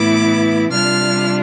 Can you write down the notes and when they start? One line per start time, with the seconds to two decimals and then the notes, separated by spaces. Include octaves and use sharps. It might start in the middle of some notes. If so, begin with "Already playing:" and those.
Already playing: A2 E3 B3 E4 D6
0.71 C3 G3 D4 F4 F6